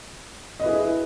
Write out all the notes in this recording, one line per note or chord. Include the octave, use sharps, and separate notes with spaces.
E4 G#4 B4 D#5